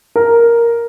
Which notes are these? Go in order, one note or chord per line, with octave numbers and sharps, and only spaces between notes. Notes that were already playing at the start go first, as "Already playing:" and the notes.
A#4